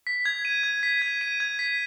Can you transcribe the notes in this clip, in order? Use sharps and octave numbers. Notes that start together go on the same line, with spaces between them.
B6
G#6
D#7
G#6
B6
G#6
D#7
G#6
B6